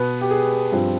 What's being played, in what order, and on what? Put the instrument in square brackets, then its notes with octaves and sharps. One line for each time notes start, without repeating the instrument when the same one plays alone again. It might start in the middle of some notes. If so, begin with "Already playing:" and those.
Already playing: [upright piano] B2 B3 B4
G4
G#4
G2 F3 C4